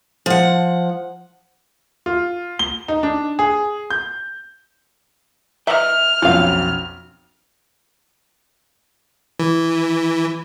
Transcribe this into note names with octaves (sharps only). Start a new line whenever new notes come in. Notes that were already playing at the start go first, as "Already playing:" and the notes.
F3 F#5
F4
G7
D#4
D4
G#4
G6
B4 D#5 E5 G5 F6
B1 F2 C#4 F4 F#4 F5
E3